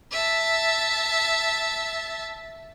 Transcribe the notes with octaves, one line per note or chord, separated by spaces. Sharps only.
E5 A5